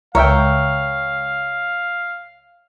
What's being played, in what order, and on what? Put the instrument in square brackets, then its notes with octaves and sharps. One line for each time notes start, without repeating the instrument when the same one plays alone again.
[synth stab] C#2 [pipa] A#4 [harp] C#5 E5 G5 [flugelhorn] F5